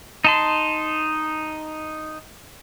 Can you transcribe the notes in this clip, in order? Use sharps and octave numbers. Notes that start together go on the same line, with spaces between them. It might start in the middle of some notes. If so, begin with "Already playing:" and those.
D#4 A5 C6